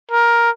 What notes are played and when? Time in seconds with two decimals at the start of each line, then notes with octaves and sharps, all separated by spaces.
0.11 A#4